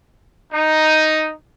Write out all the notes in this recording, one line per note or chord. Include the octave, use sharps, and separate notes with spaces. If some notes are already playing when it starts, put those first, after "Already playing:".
D#4